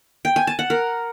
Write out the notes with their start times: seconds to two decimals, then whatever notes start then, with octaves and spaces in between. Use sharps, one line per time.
0.25 G5
0.36 G#5
0.47 A5
0.59 F#5
0.70 A#4